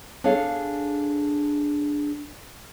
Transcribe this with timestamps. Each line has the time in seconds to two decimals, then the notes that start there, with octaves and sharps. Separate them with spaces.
0.24 D4 G#4 A4 C#5 F5